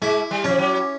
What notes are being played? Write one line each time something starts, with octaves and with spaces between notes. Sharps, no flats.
G#3 E4
G3
F3 C#4
F#3